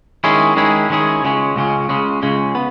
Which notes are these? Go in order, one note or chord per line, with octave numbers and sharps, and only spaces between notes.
D#3 G#3 C#4 E4 G#4
D#3 G#3 C#4 E4 G#4
D#3 G#3 C#4 E4 G#4
C#2 C#3 G#3 C#4
C#2 C#3 G#3 C#4
C#2 C#3 G#3 C#4
C#2 C#3 G#3 C#4
B3